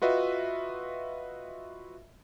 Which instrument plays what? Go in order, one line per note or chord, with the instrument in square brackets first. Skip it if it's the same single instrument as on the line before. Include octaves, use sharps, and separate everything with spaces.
[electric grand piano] F4 F#4 B4 D#5 E5